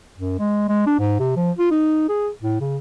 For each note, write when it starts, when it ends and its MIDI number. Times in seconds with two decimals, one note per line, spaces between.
0.18 0.38 42
0.39 0.68 56
0.69 0.86 56
0.87 0.96 62
0.99 1.17 44
1.20 1.35 48
1.36 1.52 53
1.58 1.70 65
1.71 2.04 63
2.09 2.29 68
2.43 2.59 45
2.60 2.78 49